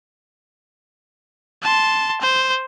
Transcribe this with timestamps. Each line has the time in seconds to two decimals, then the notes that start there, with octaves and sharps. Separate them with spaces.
1.63 A5 C6
2.21 C5